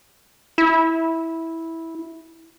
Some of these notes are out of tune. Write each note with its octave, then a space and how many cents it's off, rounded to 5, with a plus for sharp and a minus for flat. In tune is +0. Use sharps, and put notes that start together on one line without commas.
E4 -10